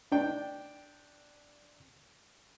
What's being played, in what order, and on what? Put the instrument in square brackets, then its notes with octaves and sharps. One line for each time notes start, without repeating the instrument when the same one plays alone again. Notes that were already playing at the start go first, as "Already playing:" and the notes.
[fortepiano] D4 G5